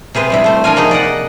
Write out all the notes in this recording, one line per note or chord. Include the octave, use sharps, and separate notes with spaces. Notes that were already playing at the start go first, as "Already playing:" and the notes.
C3 G#4 B4 C5
C3 G3 E4
A3 C5
F3 D4 A#4 F5 G#5
C3 A#3 D#4 G#4
D5 D#5 F#5